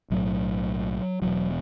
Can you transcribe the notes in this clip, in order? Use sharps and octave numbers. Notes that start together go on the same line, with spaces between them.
B1 A2 F#3
E1 E2 B2 F#3